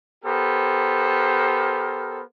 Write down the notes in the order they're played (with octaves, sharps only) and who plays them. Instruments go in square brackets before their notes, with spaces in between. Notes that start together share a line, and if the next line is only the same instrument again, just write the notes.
[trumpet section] B3 G4 A4 A#4 C5